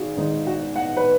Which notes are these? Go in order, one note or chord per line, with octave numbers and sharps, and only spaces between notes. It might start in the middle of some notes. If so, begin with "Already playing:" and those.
Already playing: G#1 F#4 G#4
G#1 G#2 G#3 D#4
F#4
F#5
B4